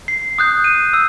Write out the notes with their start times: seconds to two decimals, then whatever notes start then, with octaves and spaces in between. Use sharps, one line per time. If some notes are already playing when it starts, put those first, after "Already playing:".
0.08 C7
0.38 D#6 F#6 G6
0.64 D#7
0.93 E6